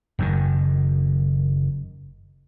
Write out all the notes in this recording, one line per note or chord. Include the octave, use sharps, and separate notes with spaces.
F#1 F#2 B2 D#3